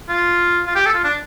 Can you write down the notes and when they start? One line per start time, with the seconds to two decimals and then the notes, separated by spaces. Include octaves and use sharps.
0.09 F4
0.67 F4
0.76 G4
0.86 A4
0.94 F4
1.04 D4